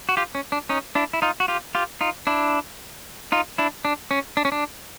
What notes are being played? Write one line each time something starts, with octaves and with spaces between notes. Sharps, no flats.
F#4
F4 G4
C#4
D4
C#4 D#4
D4 E4
E4
D#4 F4
F#4
F4 G4
F4 G4
D#4 F4
D4 E4
D#4 F4
D4 E4
D4
C#4
D4
C#4
D4